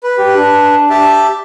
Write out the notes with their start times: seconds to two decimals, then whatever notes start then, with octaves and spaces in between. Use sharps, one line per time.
0.03 B4
0.17 G4
0.36 D4
0.90 G4 E5 A5